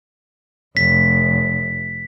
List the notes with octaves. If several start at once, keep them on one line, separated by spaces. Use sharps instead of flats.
F1 B6